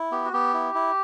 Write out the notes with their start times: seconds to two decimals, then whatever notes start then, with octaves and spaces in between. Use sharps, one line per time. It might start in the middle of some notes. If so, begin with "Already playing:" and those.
Already playing: E4
0.12 B3 G4
0.24 F#4
0.33 B3 G4
0.54 E4
0.75 E4